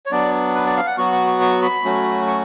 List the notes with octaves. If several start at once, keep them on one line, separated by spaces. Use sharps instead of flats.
C#5
F#3 B3 D4 D5
B4
D5
F5
F#5
F#3 B3 F#4 C#6
C#6
C#6
C#6
B5
F#3 A3 C#4 F#4
C#6